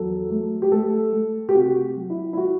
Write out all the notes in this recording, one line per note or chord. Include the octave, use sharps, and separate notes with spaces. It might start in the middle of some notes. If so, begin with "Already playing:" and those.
Already playing: E2 F#3 A4
A3
G4
A3 A4
A3
G4
C3 F#4
F#3
E4
E4
F#4